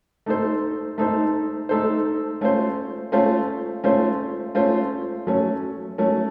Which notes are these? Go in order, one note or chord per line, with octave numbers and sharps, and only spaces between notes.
A3 D#4 A4 C5
A3 D#4 A4 C5
A3 D#4 A4 C5
A3 C#4 F4 C5
A3 C#4 F4 C5
A3 C#4 F4 C5
A3 C#4 F4 C5
F#3 A3 C#4
F#3 A3 C#4